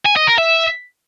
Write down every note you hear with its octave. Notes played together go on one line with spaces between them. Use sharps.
G#5
D#5
A#4
E5